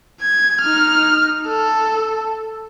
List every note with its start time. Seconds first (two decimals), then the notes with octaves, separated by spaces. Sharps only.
0.21 G#6
0.61 D#4 F6
1.46 A4